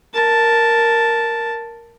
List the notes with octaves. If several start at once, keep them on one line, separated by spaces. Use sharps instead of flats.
A#4 A5